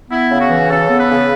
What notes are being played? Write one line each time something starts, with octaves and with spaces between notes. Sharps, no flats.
B3 E4
C#3
F#4
E3
C#3 A4
B3
B4
C#3